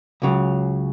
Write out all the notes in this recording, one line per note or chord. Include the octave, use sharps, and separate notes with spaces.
C#2 C#3 F#3